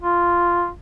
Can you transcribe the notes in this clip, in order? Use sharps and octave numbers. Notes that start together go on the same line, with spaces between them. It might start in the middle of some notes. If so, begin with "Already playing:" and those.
F4